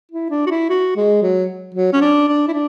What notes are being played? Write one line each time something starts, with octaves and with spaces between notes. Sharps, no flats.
E4
D4
F#4
E4
F#4
G#3
F#3
F#3
C#4
D4
D4
E4
D4